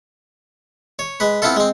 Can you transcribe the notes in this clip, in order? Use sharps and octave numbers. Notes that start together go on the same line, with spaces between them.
C#5
G#3 B4
B3 C4 E4 F4 A4
G#3 C4